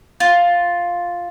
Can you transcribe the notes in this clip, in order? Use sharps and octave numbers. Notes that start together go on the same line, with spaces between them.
F4